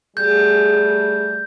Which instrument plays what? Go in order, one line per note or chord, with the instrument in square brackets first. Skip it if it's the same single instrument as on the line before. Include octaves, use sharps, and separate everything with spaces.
[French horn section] G3 A3 G#4 [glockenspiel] G6